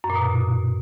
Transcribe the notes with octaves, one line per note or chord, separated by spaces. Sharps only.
F#2
A#2
B2